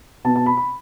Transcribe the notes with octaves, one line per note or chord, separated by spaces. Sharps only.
B2 B3 A5
A5
B5
B5